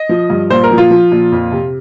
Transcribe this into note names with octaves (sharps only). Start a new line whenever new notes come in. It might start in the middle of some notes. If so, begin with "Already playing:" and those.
Already playing: D#5
F3
G2
A#2 C5
A#4
F3
F4
F3
A#2
F2
C3